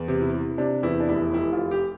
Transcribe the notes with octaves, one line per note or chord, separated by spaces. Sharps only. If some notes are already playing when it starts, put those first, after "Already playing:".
Already playing: E2
C3
E4
C3
C3 D4
E2 E4
D4
F1 E4
F1 E4
F4
F1
G4